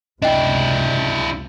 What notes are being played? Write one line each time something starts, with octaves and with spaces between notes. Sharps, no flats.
F#1 C#2 C3 D4 E4 D#5 G5